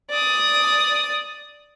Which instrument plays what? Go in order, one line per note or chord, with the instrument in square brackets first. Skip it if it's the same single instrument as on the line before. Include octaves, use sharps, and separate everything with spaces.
[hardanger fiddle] D5 D#6